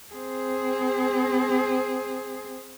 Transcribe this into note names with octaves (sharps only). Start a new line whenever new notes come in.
C4 G#4